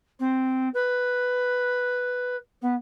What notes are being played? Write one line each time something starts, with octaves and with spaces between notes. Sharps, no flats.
C4
B4
B3